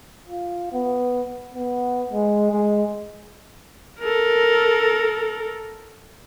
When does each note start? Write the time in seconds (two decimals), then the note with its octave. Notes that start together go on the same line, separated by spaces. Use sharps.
0.29 F4
0.73 B3
1.54 B3
2.12 G#3
2.52 G#3
4.00 A4 A#4